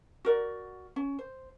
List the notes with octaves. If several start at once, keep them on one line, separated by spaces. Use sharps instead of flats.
F#4 A#4 D5
C#4
C5